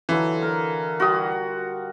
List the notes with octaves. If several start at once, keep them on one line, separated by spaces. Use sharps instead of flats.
D3 E3 F#3 F4
A#4 F5
G3 F4 F#4 D#6